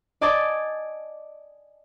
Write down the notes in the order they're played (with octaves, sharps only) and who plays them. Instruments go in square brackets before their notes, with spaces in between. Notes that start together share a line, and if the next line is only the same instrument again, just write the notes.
[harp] D5 D#5 G#5 A5 D6 A6